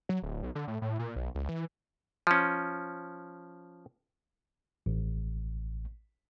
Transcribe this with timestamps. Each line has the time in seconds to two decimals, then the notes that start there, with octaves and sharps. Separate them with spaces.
0.09 F#3
0.23 D1
0.43 B1
0.55 D3
0.68 A2
0.82 A2
0.99 A#2
1.16 B1
1.35 C#2
1.49 E3
2.27 F3 C#4
4.86 A1